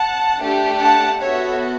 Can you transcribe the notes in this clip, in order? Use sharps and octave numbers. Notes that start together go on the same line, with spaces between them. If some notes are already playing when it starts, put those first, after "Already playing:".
Already playing: F#5 A5
A3 D4 G4
F#5 A5
B3 F#4 A4 C#5 E5